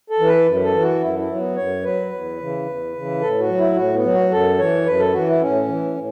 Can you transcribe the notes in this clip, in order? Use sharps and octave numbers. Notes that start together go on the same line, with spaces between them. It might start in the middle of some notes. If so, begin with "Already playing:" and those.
A4
E3
B4
F#2
A4
E3
F#4
F#2 E4
E4
F#3
B3
F#2 C#5
F#3 B4
E2
C#3 E3
E2
C#3 E3
A2 A4
F#4
F#3
E4
A2 F#4
B3
F#3
F#4
F#2 A4
E3 C#5
F#2 B4
A4
E3 F#4
E4
A2 C#4
E3
A2